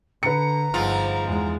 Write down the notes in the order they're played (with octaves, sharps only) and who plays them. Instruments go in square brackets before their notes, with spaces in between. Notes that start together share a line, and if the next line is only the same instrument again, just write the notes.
[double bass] D3 [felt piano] B4 C#7 [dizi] A#5
[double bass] G1 [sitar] G#2 F3 F4
[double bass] E2 G#3